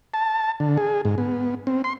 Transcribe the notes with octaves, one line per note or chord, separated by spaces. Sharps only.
A5
D3
G#4
G#2
B3
C4
C6